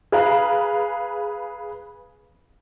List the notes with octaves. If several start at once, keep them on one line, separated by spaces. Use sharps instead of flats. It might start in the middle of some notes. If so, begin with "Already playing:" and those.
G#4 B4 F5 A#5